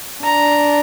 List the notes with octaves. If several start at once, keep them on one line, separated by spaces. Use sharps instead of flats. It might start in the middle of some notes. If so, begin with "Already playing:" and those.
D4 A#5